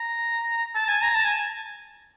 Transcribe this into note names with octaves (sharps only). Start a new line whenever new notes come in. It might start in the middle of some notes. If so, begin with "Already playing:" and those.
Already playing: A#5
A5
G#5
A#5
A5
G#5